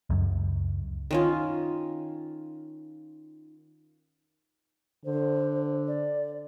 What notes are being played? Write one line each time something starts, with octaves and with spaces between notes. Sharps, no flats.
C#2 F#2
D#3 C#4 F4
D3 C5
D5